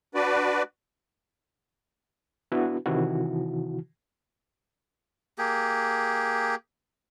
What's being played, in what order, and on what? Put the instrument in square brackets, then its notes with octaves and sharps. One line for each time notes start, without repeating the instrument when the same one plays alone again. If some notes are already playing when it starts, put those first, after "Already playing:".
[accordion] D4 F#4 B4 D5
[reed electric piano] B3 D4 E4 F#4 B4
C3 D#3 E3 E4 F#4
[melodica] A#3 G4 G#4